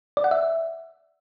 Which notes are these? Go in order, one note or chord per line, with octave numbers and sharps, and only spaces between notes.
D5
F#5
E5